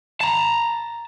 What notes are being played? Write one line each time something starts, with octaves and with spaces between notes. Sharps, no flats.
A5 A#5